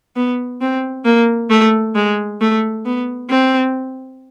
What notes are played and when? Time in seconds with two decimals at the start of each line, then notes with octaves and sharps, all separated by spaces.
0.16 B3
0.61 C4
1.05 A#3
1.50 A3
1.95 G#3
2.41 A3
2.85 B3
3.30 C4